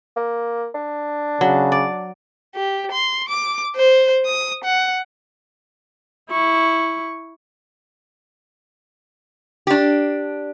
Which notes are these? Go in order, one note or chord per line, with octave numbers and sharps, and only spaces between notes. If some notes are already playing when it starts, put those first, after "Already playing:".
A#3
D4
C#3 F#3
D5
G4
C6
D6
C5
D#6
F#5
E4 C#6
D4 G4